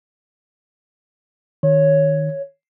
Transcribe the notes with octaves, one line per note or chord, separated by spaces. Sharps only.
D#3 C#5